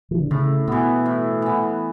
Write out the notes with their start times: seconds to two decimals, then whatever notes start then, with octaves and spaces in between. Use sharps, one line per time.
0.11 E3
0.20 D3
0.31 A2 C#3
0.67 B2 E3 B3
1.05 A2
1.42 E3 B3